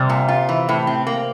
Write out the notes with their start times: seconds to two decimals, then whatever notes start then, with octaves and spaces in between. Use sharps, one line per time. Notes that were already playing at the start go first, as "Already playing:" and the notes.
Already playing: C3 G3
0.09 A#2
0.28 F4
0.49 E3
0.69 A2
0.87 C4
1.07 A#3